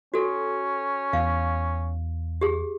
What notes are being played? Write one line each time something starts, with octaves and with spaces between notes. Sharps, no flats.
C#4 F#4 A4
E2 F5
G4 G#4